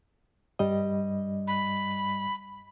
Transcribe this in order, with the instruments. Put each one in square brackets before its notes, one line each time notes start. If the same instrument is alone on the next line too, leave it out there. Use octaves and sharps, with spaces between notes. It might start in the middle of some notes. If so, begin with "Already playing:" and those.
[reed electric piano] G2 G3 D#5
[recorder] B5